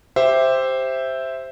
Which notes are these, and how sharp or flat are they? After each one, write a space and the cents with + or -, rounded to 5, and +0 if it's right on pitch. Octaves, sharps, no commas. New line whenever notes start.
G4 +0 C5 +0 E5 +0